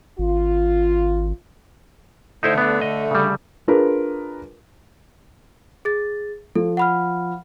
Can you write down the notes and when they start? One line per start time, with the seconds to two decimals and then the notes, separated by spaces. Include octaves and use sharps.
0.19 G#1 F4
2.43 D3 A3 D#4 E4 C5
2.58 B3 D4
2.81 D#5
3.11 C#3 G3
3.68 D4 F4 G#4 A#4 B4
5.85 G#4 A6
6.55 F3 A4
6.77 F#5 B5 F6